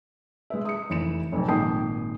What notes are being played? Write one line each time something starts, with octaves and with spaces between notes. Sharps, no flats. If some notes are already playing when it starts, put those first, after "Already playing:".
G#3 B4 E5
D#6 C#7
F1 E3 C#7 E7
F1 B1 F2
G#1 A#2 G5 G#5 D#6 C7